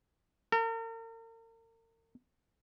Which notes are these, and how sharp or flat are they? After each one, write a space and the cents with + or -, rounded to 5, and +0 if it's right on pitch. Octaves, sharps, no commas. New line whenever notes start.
A#4 -40